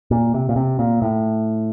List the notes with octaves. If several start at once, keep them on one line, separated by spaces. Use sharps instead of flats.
A#2
C3
A#2
C3
A#2
A2